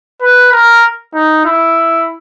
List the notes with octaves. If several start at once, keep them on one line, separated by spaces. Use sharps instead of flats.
B4
A#4
D#4
E4